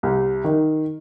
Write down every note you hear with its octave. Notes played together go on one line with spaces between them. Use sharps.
C2
D#3